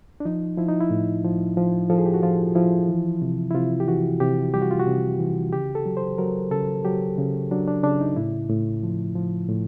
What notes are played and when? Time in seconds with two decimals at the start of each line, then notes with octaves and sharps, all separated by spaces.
0.20 D4
0.25 F3 D#4
0.58 F3 E4
0.68 D#4
0.80 E4
0.90 A2
1.24 F3
1.57 F3
1.90 F3 A4
1.98 G#4
2.06 G4
2.14 F#4
2.23 F3 F4
2.55 F3 E4
2.88 E3
3.22 C3
3.51 E4
3.54 C3 F4
3.80 G4
3.87 E3 F#4
4.20 C3 G4
4.54 G3 G4
4.62 F#4
4.71 F4
4.80 F#4
4.86 C3
5.19 E3
5.53 C#3 G4
5.75 A4
5.86 F#3
5.97 C5
6.18 F#3 A#4
6.51 C#3 A4
6.85 F#3 G4
7.18 C#3
7.51 F#3 D4
7.68 D4
7.83 C#3 D4
8.01 D#4
8.16 A2 E4
8.49 A2
8.83 F3
9.15 F3
9.48 A2